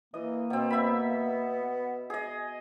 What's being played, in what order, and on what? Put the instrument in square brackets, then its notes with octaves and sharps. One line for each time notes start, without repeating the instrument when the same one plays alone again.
[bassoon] E3 [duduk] A#3 [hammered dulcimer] D#5
[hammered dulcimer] B2 C4 [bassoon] B3
[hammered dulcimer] E5 B5
G#4 D#5